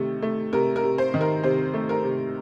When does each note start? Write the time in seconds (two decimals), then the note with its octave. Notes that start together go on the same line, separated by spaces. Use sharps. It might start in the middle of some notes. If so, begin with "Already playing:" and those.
Already playing: C3 D#3 A3
0.22 A3
0.53 C3 A#4
0.76 A#4
0.84 C3
0.98 C5
1.14 D#3
1.21 A#4
1.43 C3 C5
1.74 A3
1.89 A#4
2.04 C3